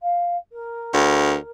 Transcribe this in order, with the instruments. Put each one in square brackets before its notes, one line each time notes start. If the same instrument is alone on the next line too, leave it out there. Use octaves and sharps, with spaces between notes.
[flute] F5
A#4
[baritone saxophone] D2